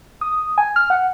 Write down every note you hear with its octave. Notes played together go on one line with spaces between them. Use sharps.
D#6
G#5
F6
F#5